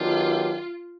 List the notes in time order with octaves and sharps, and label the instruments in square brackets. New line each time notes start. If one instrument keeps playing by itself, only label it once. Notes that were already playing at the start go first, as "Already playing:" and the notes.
Already playing: [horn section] D#3 F#3 B3 D4 G4 [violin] F4